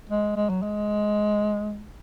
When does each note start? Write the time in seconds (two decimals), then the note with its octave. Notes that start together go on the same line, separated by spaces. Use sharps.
0.09 G#3
0.36 G#3
0.49 F#3
0.62 G#3